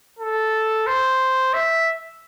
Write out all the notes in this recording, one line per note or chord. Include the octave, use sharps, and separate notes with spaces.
A4
C5
E5